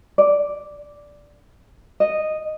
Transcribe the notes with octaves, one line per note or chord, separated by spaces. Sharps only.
D5
D#5